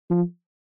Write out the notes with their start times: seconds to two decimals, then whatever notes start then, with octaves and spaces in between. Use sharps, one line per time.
0.10 F3